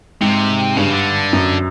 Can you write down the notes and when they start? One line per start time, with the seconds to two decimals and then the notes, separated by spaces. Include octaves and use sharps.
0.21 G#2 C3
0.77 G2 C#3
0.91 D3
1.33 F#2